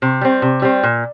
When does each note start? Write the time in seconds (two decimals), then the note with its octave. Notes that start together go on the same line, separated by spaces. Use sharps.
0.02 C3
0.21 G3 C4
0.42 C3
0.62 G3 C4
0.83 A#2